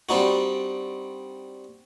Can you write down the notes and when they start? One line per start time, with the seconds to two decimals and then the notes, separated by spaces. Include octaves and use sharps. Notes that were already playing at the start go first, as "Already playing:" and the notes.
0.09 G3 C4 D4 D#4 F#4